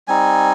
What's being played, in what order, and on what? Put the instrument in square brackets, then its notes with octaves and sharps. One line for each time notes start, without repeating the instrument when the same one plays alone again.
[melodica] G3 C4 D#4 G#5